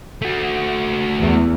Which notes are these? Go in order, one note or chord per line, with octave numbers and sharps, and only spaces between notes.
A3 F#4
E2